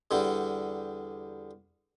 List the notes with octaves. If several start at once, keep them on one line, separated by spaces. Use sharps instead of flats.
E2 D3 G3